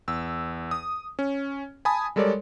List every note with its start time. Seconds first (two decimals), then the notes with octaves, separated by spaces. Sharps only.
0.08 E2 E6
0.71 D#6
1.19 C#4
1.85 G#5 A5 B5 D#6
2.16 G3 G#3 A4 A#4 C#5 D5